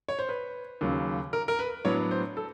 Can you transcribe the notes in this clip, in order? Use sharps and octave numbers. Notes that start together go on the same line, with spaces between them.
C#5
C5
B4
D#2 C#3 F#3
A#4
A#4
B4
A2 F#3 B3 D4 C#5
C5
A4